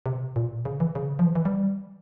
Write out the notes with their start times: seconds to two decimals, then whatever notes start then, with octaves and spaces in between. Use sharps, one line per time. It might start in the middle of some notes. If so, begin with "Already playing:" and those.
0.06 C3
0.36 A#2
0.65 C#3
0.80 E3
0.95 C#3
1.19 F3
1.25 E3
1.35 E3
1.45 G3